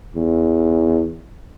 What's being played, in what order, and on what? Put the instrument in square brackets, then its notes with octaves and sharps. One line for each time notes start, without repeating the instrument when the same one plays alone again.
[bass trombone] E2